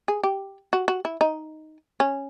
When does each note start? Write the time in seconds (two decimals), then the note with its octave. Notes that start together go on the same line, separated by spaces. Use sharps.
0.08 G#4
0.23 G4
0.73 F#4
0.88 F#4
1.05 E4
1.21 D#4
2.00 C#4